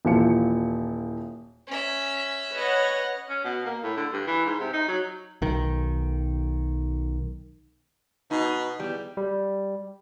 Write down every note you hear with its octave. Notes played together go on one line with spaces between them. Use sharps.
D#1 E3 F3 C#7
C#4 E5
B4 C#5 D#5 F#5
C#4
B2
A#3
A2
D3
G2
E3
G#2
C3
D#4
F#3
B1 D#3
B2 D#4
E2 G3
G3